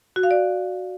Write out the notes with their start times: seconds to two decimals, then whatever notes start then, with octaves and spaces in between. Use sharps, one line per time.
0.16 F#4
0.23 F5
0.31 D5